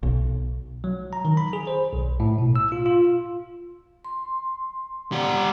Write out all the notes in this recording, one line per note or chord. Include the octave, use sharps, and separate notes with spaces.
B1
F#3
A#5
D#3
B5
G#4
C5
B1
A2
B2
E6
F4
F4
C6
G3 F#5